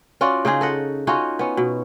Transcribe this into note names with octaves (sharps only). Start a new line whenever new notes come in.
C#4 F4 F#4 D5
C#3 D#4 F4 G#4
A4 D#5 F#5
C#4 D#4 F4 F#4
B3 C#4
B2